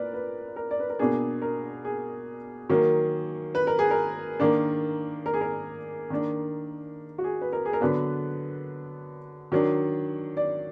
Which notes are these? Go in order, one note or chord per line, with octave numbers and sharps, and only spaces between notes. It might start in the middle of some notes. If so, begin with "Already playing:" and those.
Already playing: A#2 A#4 B4 D5
B4
A#4
D5
B4
A#4
B2 A#3 D4 G#4
A#4
G#4
D#3 F#3 A#3
B4
A#4
G#4
A#4
D#3 A#3 D4
A#4
G#4
A#4
D#3 A#3 D4
F#4
G#4
B4
A#4
G#4
A#4
D3 F#3 B3 D4 B4
D#3 F#3 D4
D5